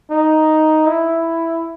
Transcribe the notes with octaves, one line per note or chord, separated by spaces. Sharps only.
D#4
E4